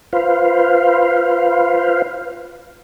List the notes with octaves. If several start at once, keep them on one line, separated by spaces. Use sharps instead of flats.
F4 B4 C5 F5